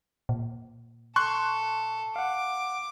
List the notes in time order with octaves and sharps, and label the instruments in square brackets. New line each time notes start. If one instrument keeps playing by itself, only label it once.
[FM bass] A#2
[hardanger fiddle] A4 [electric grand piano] C6 C#6 F#6
[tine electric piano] F5 F#5 [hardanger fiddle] D6